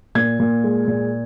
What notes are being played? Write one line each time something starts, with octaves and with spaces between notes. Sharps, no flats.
A#2 G#6
A#2
G#3
A#2